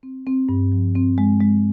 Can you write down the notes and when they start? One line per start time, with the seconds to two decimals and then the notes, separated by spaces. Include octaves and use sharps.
0.03 C4
0.27 C4
0.49 G2
0.72 F3
0.95 C4
1.18 G#3
1.40 G#3